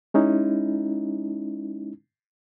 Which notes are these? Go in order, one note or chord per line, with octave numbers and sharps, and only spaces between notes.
G#3 C#4 D#4 E4